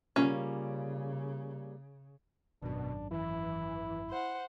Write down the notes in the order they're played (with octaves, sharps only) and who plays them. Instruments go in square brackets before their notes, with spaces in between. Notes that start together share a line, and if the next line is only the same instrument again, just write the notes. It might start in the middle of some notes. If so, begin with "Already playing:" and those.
[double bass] C#3 [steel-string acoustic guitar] G3 A#3 F4 [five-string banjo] C#4 F5
[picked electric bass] G#1 F#2 [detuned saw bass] B2 [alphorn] D4
[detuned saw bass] E3 [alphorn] E4
[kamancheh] C5 F#5